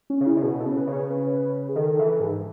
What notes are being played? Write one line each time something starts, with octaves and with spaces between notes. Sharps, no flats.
C#4
C#3
E4
C#3
B2 G#4
A4
C#3
B4
C#3
C#5
B4
G#4
D#3 A4
E3
G#2